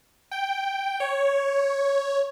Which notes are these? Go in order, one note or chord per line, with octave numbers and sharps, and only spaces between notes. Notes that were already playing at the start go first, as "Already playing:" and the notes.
G5
C#5